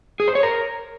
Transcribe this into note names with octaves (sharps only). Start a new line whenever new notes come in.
G#4
C5
C#5
A#4